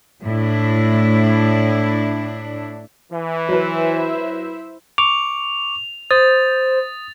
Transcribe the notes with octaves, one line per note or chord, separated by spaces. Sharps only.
A2 D4 E4
E3
F#3 E4 B4 C5 E5
C#6 D6 F7
C5 D#6 A6